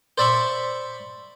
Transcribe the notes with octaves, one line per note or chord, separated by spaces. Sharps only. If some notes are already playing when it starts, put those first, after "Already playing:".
C5 D5 E5 B5 C#6